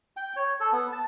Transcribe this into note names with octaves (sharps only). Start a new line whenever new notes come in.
G5
C#5
A4
B3
A5